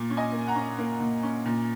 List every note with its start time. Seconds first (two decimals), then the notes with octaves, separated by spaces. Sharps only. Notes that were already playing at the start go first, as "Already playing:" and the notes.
Already playing: A#2
0.10 C#4
0.17 D#5 G#5
0.32 A#3
0.47 F#5 A#5
0.55 C#4
0.78 A#3
1.00 A#2
1.23 C#4
1.45 A#2